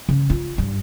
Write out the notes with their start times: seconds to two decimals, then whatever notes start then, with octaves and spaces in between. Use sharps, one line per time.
0.09 C#3
0.30 F4
0.58 G2